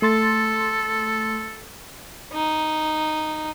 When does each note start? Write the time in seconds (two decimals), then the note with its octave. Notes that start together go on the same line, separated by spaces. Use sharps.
0.02 A3 A4 C6 A6
2.33 D#4